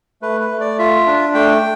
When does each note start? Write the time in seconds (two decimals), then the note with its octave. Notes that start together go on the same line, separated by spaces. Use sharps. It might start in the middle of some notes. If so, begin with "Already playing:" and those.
0.22 A3 B4
0.41 B4
0.51 A3
0.60 D5
0.79 F4 E5
1.07 D4
1.34 A3 G5